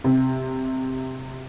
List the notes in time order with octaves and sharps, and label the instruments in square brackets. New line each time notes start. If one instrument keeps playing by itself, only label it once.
[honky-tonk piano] C3